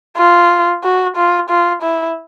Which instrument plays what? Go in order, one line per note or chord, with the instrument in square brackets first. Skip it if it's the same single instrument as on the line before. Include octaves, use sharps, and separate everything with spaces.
[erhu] F4
F#4
F4
F4
E4